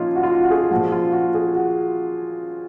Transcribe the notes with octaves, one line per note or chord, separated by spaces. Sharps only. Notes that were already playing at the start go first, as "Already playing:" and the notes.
Already playing: A#2 F3 C#4 D#4 F4
F#4
F4
F#4
F#4
G#4
F#4
A#2 F3 F#4
F4
F#4
G#4
F#4